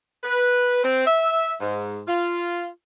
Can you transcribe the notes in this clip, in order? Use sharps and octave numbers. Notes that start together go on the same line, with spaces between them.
B4
C4
E5
G#2
F4